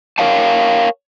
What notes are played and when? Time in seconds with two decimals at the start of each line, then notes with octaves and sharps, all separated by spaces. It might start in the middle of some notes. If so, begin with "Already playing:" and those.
0.18 A#4 B4 C#5 F5 G5 A5